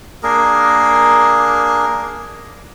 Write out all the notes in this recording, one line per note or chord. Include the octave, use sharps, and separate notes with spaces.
A#3 D4 G#4 A#4